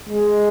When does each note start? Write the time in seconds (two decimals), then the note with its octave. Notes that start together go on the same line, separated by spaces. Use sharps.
0.09 G#3